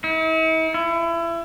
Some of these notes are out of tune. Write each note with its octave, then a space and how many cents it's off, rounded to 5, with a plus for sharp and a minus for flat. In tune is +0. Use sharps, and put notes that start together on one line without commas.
E4 -45
E4 +30